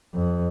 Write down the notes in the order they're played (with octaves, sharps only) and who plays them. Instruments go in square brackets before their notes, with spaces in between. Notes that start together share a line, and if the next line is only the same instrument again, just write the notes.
[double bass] F2